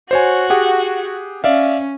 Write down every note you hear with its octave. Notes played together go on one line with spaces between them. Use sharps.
F#4 C5 C#5 G#5
G4 G#4 F#5
C#4 D5 E5 F5